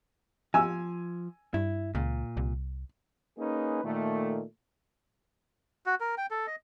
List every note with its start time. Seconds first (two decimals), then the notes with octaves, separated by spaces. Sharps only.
0.54 F3 G#5 E6
1.54 G2 E4
1.95 C#2 A#2
2.37 C2
3.38 A#3 C#4 D#4 G#4 B4
3.84 A#2 D#3 A3
5.86 F#4
6.00 A#4
6.18 G5
6.31 A4
6.47 D#5